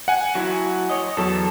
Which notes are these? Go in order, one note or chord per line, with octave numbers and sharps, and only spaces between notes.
F#5 G#5
F#3 E4
C#5 D#5
E2 F#3 A4